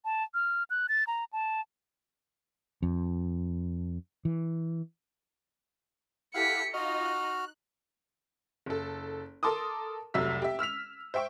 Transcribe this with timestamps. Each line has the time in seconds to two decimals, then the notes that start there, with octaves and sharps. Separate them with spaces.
0.05 A5
0.34 F6
0.70 F#6
0.89 A6
1.07 A#5
1.33 A5
2.83 F2
4.25 E3
6.34 E4 G4 A4 F5 F#5 B6 C#7
6.74 D#4 F4 F#4 D#5 F6
7.05 F#6
8.66 F#1 A4
9.43 A4 A#4 A5 C6 D6 D#6
10.14 F1 C2 F#3 E5 E6 B6
10.42 G4 E5
10.59 E6 F6 B6 F7
11.14 C5 E5 G5 C#6